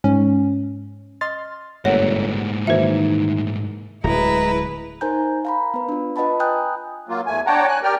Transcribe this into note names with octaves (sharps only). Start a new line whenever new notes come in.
G#2 C#4
D#5 C6 F6 A6
G1 G#2 A3 A#3 C#5 F#5
D#3 E3 F#3 A#3 C5 E5
D1 G#3 E4 B4 A#5
D#4 A#4 C5 G#5 A#5 G6
F5 A#5 B5
B3 B4
D4 F4
F4 B4 D#5 F#5 A5 B5
G5 G#5 A#5 D#6 F#6 G6
F#3 A#3 F4
E2 A3 G#5
D4 C#5 F#5 G5 A5 A#5
G#5 F#6
G4 A#4 D5 G5 F6